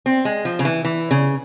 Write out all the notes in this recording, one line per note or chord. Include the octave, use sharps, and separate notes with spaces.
C4
G#3
F3
C#3
E3
E3
C#3